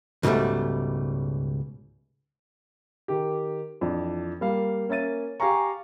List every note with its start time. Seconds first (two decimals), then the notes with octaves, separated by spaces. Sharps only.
0.23 C#2 G#2 B2 G3 A3
3.08 D#3 G4
3.81 F2 E3 D4
4.41 G3 A#3 F5
4.88 A#3 C#4 E5 A6 D#7
5.40 G4 F5 G#5 A#5 C#6